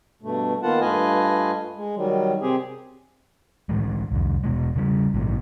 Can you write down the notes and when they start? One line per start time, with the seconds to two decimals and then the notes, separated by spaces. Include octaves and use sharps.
0.22 G2 B2 A3
0.62 D#3 A#3 B3 F4 F#5 A5
0.81 G2 A3 F4 B4 D#5 G#5
1.76 G#3
1.96 D#3 F#3 G3
2.41 C3 C4 G4 G#4
3.69 A2 E3 G#3
4.12 C2 F2
4.44 E1 B2 G#3
4.76 C#3 G3
5.14 A#1 G#2 B2 E3